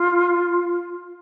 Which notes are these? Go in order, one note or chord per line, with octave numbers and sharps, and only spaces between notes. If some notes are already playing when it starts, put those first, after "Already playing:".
Already playing: F4